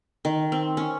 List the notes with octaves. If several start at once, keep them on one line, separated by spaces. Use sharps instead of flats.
D#3
C4
C#4